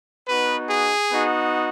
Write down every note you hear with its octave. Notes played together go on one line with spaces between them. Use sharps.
B3 D#4 F#4 B4
G#4
B3 D#4 F#4